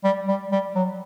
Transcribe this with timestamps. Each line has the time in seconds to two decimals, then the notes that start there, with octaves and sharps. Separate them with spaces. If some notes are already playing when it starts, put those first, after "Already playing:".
0.04 G3
0.28 G3
0.52 G3
0.75 F#3